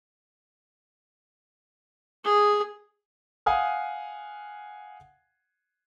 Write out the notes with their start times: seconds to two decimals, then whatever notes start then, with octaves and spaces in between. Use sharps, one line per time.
2.24 G#4
3.46 F5 F#5 G#5 D#6 F6